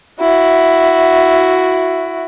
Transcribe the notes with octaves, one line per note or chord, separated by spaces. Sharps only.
E4 F#4